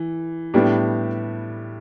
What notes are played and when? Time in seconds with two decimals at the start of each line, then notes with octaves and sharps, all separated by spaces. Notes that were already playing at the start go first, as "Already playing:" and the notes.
Already playing: E3
0.54 A2 G3 B3 D4 G4